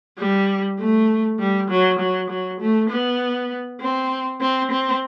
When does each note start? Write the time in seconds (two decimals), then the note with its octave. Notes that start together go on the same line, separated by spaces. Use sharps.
0.19 G3
0.79 A3
1.39 G3
1.70 F#3
1.99 F#3
2.30 F#3
2.60 A3
2.90 B3
3.81 C4
4.41 C4
4.71 C4